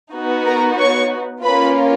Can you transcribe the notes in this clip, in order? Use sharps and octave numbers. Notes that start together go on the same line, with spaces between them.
B3 D#4 F#4
A#4 A#5
C#5 C#6
A#3 C#4 F4 B4 B5